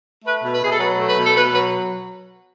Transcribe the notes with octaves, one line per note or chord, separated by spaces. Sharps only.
A3 B4
B2
B4
B2 G#4
A4
F#3 B4
A3
B4
B2
A4
B2 B4
F#3 B4